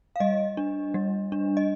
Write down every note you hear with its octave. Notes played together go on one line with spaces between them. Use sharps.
F5
G3 D#5
D4
G3
D4
D#5